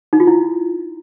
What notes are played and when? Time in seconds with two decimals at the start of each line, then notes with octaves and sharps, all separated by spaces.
0.13 D#4
0.20 F4
0.27 E4